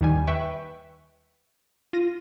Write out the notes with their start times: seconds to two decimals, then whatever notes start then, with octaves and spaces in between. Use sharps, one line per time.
0.01 D#2 D#3 G3 G#5
0.27 B4 E5 G5 C#6
1.93 F4 A#6 D#7